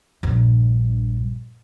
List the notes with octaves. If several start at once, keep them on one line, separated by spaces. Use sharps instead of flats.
A#1 G2